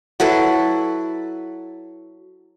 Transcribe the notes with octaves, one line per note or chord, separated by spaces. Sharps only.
F#3 E4 A4 B4